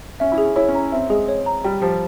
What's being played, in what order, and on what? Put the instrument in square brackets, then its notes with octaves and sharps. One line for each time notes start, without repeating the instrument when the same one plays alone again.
[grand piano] C#4 [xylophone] E5
[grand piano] E4
[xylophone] G#4
[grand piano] C#4
[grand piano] E4 [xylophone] C#5
[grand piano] C#4
[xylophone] A#5
[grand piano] C4 [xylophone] E5
[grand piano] G#3 [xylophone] G#4
[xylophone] C#5
A#5
[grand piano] G3 [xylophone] G5
[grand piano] F3 [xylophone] G4